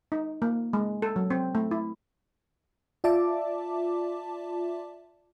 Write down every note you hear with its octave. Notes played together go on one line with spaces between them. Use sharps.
D#4
A#3
G#3
A4
F#3
C4
A3
E4
F4 D5 E5 A5 D6